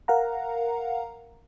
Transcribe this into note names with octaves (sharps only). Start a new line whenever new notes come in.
A#4 F5 F#5 A#5